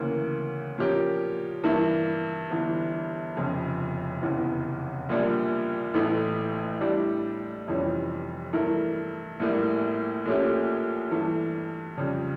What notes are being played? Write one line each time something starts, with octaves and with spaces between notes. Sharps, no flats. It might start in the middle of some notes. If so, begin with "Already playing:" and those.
Already playing: D2 C#3 E3 A#3
A#2 F3 C#4 G4 A#4
G2 E3 A#3 E4
G1 G2 E3
F1 F2 C#3 F3
F1 E2 C#3 E3
A#1 A#2 G3 D4
A1 A2 E3 A3 E4
A2 G3 D4 G4
F1 F2 E3 G3 C#4
G2 E3 A3 E4 A#4
A#1 A2 G3 A#3
A#1 A#2 A3 C#4 G4
G2 E3 A3
F2 C#3 G3